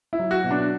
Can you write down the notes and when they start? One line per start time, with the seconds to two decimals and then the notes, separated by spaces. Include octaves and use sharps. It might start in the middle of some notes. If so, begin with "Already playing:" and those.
0.13 E4
0.19 F#3
0.31 F#4
0.44 B2
0.51 D4